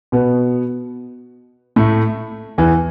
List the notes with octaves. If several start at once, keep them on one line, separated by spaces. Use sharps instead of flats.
B2 B3
A2 A3
E2 E3